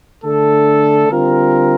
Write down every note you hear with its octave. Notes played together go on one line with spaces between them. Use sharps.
D3 A3 D4 A4
D3 G3 C4 F4 A#4